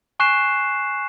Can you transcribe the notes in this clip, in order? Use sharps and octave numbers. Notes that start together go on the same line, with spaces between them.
G#5 C#6 F#6 C7 E7